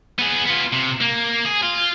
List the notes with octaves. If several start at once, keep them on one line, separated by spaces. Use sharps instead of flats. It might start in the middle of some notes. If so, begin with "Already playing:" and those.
B3 G#4
B3 F4
C3
A#3
G#4
F4